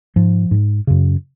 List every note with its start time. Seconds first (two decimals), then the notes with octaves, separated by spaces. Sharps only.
0.16 G#2 F3
0.51 G#2
0.87 F#2 C#3